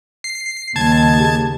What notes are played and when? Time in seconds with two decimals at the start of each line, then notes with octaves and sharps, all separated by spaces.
0.24 C7
0.76 D#2 C#3 G3 A5 G#6
1.19 C#3 G4 G#4